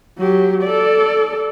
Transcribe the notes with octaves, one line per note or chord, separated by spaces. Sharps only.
F#3 G4
A4 D5